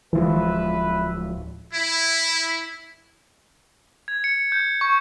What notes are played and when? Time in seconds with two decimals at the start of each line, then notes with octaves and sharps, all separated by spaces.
0.13 D1 E3 F3 G#3 B4 E5
1.73 E4
4.08 G#6
4.24 C#7
4.52 G6
4.81 C#6